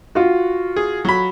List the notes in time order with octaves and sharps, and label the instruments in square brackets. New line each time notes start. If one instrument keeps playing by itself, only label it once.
[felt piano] F4 F#4
[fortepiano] G#4
F#3 B5